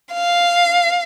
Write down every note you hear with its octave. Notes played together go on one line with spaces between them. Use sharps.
F5